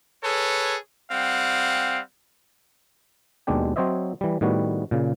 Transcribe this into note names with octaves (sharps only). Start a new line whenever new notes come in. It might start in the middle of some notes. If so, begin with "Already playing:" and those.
G#4 A4 B4 C#5
G3 C4 F5 F#5
D#2 B2 G#3 D4 G4 G5
F#3 C4 C5 C#5 D#5 E5
E3 G3
A2 D#3 G3 B3 F#4
A#2 C#3